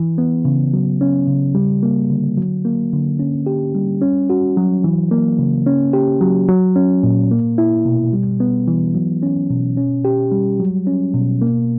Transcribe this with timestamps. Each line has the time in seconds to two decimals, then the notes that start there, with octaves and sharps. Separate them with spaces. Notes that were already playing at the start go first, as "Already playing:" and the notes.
Already playing: E3
0.18 B3
0.45 C#3
0.74 F#3
1.01 C#4
1.27 C#3
1.55 G3
1.83 A#3
2.10 D3
2.38 F#3
2.65 A#3
2.93 D3
3.19 C#4
3.46 G4
3.75 G3
4.01 C#4
4.30 F#4
4.57 F#3
4.84 E3
5.11 A#3
5.39 C#3
5.66 C#4
5.93 G4
6.21 F#3
6.48 F#3
6.76 C#4
7.03 A#2
7.31 A#3
7.58 E4
7.85 B2
8.13 G3
8.40 B3
8.68 E3
8.95 F#3
9.23 C#4
9.50 B2
9.77 C#4
10.05 G4
10.32 G3
10.60 F#3
10.87 C#4
11.14 B2
11.42 A#3